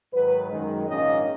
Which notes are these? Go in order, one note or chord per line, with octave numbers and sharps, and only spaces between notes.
G#2 D#3 F#3 B4
F#2 D#3 G#3
A#1 G#2 D#3 A#3 C#4 D#5